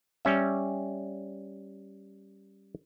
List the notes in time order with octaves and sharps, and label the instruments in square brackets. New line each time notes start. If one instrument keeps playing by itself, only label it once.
[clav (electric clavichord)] G3 C#4 E5